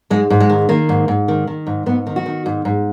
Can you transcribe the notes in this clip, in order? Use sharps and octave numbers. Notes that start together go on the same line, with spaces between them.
G#2 G#3
G#2
G#3
D#3
D#3 A#3
G#2
G#2
D#3
D#3
G#2
G#2 B3
D#3
F#4
D#3
G#2
G#2